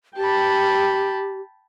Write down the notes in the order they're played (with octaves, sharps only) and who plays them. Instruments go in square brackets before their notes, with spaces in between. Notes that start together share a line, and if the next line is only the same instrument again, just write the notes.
[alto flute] G4 [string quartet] G5 A5 B5